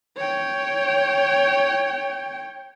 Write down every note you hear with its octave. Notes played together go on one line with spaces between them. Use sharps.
C#5 G5